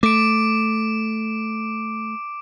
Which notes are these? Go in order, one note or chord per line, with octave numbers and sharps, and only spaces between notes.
A3 D6 D7